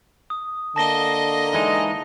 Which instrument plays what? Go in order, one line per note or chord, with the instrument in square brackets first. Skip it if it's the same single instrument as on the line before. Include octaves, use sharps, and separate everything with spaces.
[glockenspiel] D#6
[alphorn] D3 [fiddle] A#3 D#5 [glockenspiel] A5 A#6 G7
[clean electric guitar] E3 G#3 D#4